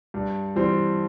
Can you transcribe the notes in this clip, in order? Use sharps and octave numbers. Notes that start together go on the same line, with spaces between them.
G2
E3 G3 C4